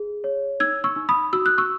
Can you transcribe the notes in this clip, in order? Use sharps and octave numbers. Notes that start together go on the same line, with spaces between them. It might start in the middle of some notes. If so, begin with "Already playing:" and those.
Already playing: G#4
C#5
D#4 E6 G#6
C#6 E6
D#4
B5 D#6
F#4 E6
F#6
C#6 E6